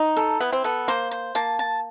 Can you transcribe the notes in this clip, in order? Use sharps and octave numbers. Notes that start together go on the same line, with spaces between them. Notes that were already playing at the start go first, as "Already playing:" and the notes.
Already playing: D#4
A4
B3 E4
C4
B3 A4
A#3 C5
C5
A#3 A5
A5